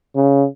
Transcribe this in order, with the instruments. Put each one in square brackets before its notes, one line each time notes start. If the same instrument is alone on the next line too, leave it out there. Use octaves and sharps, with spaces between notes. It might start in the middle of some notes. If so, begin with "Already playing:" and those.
[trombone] C#3